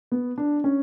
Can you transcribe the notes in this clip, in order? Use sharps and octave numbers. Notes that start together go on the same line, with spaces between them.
B3
D4
C#4